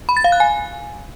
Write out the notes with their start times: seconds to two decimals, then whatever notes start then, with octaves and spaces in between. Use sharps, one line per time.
0.09 B5
0.17 A6
0.24 F5
0.32 F#6
0.40 G#5